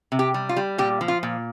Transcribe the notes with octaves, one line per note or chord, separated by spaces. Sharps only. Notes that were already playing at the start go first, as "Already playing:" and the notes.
C3
G4
G3
F4
G3
A#2 G4
F3
F4
A#2